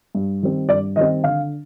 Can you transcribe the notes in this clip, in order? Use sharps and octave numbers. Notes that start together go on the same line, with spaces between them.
G2
D#3 G3 C4
G2 D5
D#3 G3 C4 D#5
D3 F5